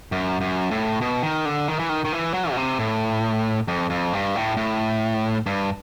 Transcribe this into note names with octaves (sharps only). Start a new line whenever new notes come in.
F#2
F#2
A2
B2
D#3
D3
D#3
E3
D#3
D#3
E3
F#3
B2
C3
A2
F2
F2
G2
A2
A2
G2